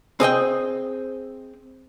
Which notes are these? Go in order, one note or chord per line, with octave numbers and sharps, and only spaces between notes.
C4 G#4 D#5 G5